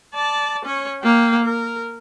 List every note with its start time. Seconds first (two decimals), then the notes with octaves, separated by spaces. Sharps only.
0.14 D5 A5
0.65 C#4 C#5
1.03 A#3 G5
1.44 A#4